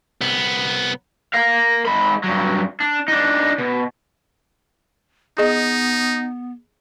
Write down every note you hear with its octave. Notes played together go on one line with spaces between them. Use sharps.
C2 B3
A#4 F5
G#2 B5
G2 F#3
D4
D4 D#4
B2
B3 D#4 G#4 D#5